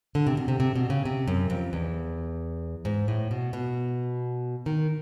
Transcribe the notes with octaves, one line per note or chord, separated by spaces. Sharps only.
D3
C3
B2
C3
C3
B2
C#3
C3
F#2
F2
E2
G#2
A2
B2
B2
D#3